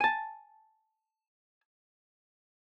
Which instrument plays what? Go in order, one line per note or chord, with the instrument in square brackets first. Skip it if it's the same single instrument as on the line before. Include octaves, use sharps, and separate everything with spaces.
[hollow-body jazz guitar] G#5 A5